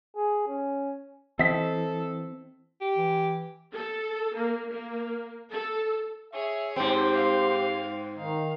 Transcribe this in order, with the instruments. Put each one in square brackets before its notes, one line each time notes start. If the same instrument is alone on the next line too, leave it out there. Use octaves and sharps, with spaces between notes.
[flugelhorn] G#4
C#4
[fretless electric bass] E3 [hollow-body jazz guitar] C4 [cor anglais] A4 [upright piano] D#5 B6
[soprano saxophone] G4
[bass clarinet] E3
[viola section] A4
A#3
A#3
A4
[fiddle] G#4 C#5 [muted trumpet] E5
[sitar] G#2 C4 [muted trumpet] G4 [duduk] C5
[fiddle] F5
[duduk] D#3 [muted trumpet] D#4 [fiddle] F5